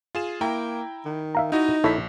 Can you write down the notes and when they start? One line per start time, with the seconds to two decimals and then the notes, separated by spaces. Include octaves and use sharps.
0.15 F4 G#4 E7
0.41 A#3 E4 G5 A#5
1.05 D#3
1.35 E5 F5 A#5
1.52 D#4 E4 F#4 D#5
1.84 A#1 E4 A4 C#5 B6